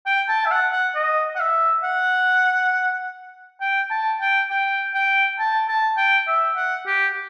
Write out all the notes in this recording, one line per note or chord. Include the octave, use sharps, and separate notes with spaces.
G5
A5
E5
F#5
F#5
D#5
F#5
E5
F#5
G5
A5
G5
G5
G5
A5
A5
G5
E5
F#5
G4